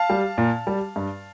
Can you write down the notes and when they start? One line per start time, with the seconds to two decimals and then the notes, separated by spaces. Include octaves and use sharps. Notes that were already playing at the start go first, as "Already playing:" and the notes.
Already playing: F5 A5
0.10 G3
0.38 A#2
0.67 G3
0.96 G2